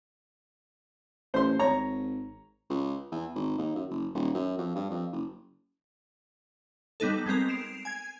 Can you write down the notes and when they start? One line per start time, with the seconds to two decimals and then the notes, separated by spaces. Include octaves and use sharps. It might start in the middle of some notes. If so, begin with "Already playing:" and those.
1.34 A1 C5 C6
1.59 G#1 C#5 A#5
2.70 C#2
3.12 E2
3.35 G#1
3.58 D#2
3.75 F#2
3.90 F#1
4.15 D#1
4.35 F#2
4.58 F2
4.76 G2
4.91 F2
5.13 F#1
7.00 G3 B3 D#4 A4
7.26 G#3 B3 C4 A#4
7.48 C7 D7 E7 F7
7.85 G#5 G#6